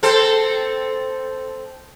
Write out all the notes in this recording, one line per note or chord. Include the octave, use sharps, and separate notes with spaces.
C4 A4 C5